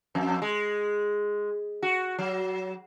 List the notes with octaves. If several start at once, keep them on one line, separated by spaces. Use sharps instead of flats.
F2
G#3
F#4
F#3